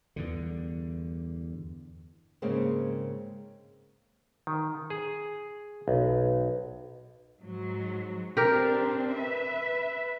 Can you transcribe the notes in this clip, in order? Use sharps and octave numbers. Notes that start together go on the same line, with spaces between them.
E2 G2 D3
G#2 C#3 G#3 A#3 C4
D#3
G#4
B1
G#2 F#3
C4 D4 G4 A#4
B4 E5